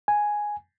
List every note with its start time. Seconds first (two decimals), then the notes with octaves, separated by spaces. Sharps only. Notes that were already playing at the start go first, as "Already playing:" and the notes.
0.08 G#5